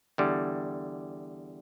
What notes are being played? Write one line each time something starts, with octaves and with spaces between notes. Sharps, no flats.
E2 D3 G3